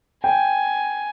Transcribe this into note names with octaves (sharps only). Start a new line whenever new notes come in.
G5 G#5